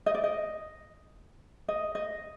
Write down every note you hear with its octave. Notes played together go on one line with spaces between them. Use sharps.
D#5
D5
D#5
D#5
D#5